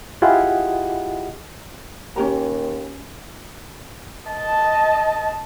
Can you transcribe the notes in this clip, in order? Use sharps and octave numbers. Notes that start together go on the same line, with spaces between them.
E4 F4 G4 G#4 D#5 F#5
D#2 C#4 G4 A#5
D#5 A5